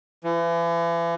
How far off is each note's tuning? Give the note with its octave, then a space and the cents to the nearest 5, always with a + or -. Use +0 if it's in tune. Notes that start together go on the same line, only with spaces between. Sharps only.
E3 +40